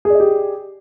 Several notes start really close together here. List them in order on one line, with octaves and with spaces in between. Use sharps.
G#4 D5 D#5 G4